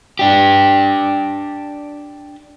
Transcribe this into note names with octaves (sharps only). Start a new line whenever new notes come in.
D4 G4